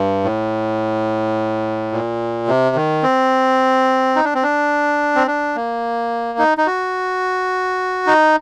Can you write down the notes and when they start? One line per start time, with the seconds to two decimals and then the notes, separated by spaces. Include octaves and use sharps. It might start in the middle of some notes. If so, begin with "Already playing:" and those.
Already playing: G2
0.24 A2
1.92 A#2
2.48 C3
2.76 D#3
3.03 C4
4.16 D#4
4.25 D4
4.35 C4
4.43 D4
5.15 C4
5.27 D4
5.56 A#3
6.39 D#4
6.58 D#4
6.67 F#4
8.07 D#4